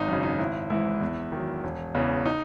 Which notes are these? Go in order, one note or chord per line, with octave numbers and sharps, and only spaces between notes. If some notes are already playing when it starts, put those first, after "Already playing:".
Already playing: G#1 D#4
F#2 C#3
D#4
G#1 E4
G#2 E3 E4
E2
D#3 F#3
E1
E2 C#3 E3
D#4